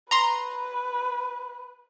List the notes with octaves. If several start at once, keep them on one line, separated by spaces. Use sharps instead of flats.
B4 A#5 C6